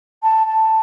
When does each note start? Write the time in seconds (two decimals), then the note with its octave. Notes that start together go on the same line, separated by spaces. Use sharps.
0.23 A5
0.47 A5